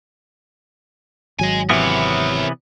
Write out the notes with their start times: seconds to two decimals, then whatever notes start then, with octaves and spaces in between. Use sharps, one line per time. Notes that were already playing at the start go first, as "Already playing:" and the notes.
1.39 G#1 F#3 D#5 G#5
1.70 C3 E3 B3 A#4 C#5